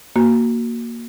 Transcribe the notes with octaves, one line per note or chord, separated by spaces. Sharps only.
A#3 F#4